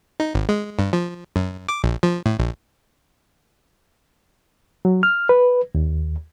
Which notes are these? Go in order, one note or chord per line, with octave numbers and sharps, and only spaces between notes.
D#4
G#1
G#3
G2
F3
F#2
D6
A#1
F3
A2
A#1
F#3
F6
B4
D#2